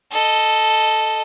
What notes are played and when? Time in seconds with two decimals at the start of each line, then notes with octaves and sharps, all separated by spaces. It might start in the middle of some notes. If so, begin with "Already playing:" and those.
0.12 A4 D#5